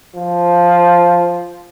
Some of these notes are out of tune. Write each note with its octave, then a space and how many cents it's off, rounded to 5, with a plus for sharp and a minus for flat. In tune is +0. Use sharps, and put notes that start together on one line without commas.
F3 +0